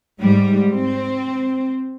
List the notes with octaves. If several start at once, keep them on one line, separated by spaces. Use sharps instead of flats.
G#2 G3
C4